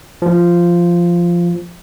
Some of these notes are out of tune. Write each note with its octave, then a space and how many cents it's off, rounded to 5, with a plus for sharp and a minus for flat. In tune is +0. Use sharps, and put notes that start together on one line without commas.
F3 -10